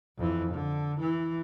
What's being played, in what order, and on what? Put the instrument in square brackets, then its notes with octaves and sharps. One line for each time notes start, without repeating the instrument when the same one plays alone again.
[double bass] F2 E3
D3
E3